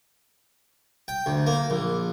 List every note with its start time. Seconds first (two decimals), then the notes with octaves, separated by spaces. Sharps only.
1.08 G5
1.26 D2
1.47 A#3
1.70 A#1